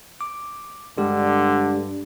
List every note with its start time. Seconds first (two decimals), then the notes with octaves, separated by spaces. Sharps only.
0.21 D6
0.98 G2 D3 G#3 G4